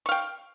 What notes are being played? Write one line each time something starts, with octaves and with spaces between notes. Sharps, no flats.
F5 G5 C#6